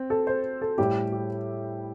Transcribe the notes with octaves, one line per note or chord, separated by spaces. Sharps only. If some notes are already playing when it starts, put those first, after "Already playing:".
Already playing: C4
A4
C5
A4
A2 G3 E4 G4
G4